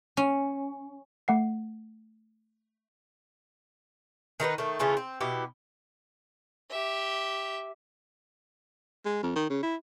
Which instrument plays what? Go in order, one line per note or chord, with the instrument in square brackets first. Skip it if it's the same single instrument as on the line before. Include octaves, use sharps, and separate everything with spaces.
[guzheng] C#4
[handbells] A3 F#5 C7
[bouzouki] D#3 D#4 A#4 B4
D#3 A3
C#3 E3 A3 F4
C4
B2 E4 G4
[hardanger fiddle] G4 E5
[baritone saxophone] G#3
F2
D#3
C#3
E4